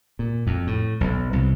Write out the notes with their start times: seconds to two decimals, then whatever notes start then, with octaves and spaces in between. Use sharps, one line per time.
0.19 A#2
0.47 F2
0.67 A2
1.01 B1
1.33 C2